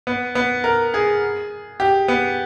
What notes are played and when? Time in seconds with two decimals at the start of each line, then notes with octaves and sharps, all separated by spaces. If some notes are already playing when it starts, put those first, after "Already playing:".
0.07 B3
0.35 B3
0.64 A#4
0.94 G#4
1.80 G4
2.08 B3